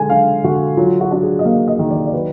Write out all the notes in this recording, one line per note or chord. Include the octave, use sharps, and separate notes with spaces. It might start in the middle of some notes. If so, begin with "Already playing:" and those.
Already playing: D3 G#3 G#5
D4 F5
D3 F#4
F#3 F4
F#4
D4 F#4
G#4
D#5
A#3 F5
D#5
D#3
D5
D5
F#3 B4